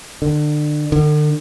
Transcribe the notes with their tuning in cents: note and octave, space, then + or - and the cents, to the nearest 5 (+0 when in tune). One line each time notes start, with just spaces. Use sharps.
D3 +30
D3 +40